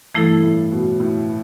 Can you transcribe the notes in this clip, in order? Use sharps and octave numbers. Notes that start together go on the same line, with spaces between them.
G2 E3 A3 E4 A4
A2
B2
A2